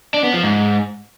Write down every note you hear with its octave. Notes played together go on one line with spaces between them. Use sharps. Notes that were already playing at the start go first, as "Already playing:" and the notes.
D4
B3
F3
G#2